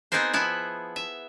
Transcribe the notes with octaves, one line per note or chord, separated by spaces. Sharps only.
B3 C4 D#4 G#4 A#4 C5
F3 B3 E4
E5